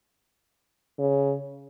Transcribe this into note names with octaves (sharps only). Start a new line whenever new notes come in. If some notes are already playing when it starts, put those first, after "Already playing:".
C#3